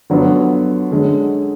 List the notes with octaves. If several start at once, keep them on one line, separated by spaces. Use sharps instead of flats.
D3 F#3 B3 F4
D3 G#3 C#4